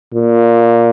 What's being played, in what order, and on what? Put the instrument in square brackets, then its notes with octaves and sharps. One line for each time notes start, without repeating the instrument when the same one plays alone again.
[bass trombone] A#2